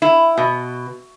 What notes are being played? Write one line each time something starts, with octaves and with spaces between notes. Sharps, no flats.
E4
B2